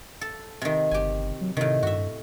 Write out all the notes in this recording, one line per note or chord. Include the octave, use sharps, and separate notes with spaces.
A4
C3 D#3
G1 G4 G#5
F#3
A2 C3 D#3
G2 F#4 E5